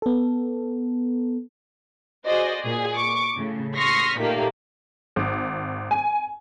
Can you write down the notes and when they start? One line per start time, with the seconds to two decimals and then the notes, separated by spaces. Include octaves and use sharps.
0.02 B3 A4
2.26 F#4 G#4 C5 D5 D#5
2.61 A#2 G#4
2.95 C#6 D6
3.36 A2 C#3
3.77 C6 C#6 D#6 F6 A#6 B6
4.19 A#2 D#3 A3 A#3 G4
5.16 G#1
5.91 G#5